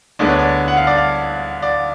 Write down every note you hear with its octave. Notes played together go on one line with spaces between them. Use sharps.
D2 D3 G#3 B3 D5
C#5
D5
F#5
F5
D5
F5
D5